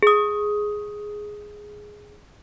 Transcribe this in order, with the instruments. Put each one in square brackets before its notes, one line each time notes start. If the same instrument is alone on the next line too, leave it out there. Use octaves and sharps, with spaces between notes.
[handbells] G#4 D#6